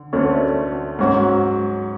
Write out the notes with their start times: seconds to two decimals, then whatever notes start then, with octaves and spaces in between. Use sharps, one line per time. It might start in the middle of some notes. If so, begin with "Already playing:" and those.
Already playing: D3
0.13 D2 D3 A3 C#4
0.99 G#2 F#3 C#4 F#4